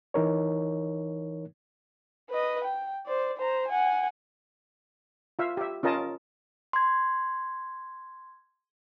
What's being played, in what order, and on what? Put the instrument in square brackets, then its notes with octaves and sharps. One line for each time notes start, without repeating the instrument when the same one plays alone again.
[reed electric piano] E3 D#4 A#4 C#5
[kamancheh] B4 D#5
G5
C5 D5
C5 A#5
F#5 G#5
[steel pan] F4 E5 F5
G4 E5
C#4 F4 A#4 D#5 A5
[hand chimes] C6 G#6